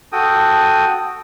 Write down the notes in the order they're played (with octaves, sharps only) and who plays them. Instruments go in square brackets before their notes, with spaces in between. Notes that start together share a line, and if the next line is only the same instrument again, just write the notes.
[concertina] F#4 A4 G5 D#6